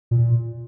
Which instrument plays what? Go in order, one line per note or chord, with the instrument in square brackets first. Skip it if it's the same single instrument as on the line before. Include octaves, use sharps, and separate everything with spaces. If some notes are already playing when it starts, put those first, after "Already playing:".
[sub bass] A#2